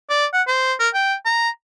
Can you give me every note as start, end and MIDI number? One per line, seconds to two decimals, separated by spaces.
0.09 0.26 74
0.33 0.42 78
0.47 0.73 72
0.80 0.89 70
0.94 1.14 79
1.25 1.49 82